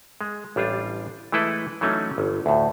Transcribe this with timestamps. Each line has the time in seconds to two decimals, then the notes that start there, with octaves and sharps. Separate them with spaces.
0.21 G#3
0.56 A1 G3 D4 F4
1.32 E3 G#3 A3 E4 A4 B4
1.81 E3 F#3 A3 C#4 D#4
2.18 G1
2.46 D2 A2